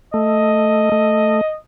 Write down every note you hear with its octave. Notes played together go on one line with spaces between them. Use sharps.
A3 D#5
A3